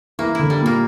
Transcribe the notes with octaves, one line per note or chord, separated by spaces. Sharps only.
E3 A#3
D3 E4
G3
A#2 A#3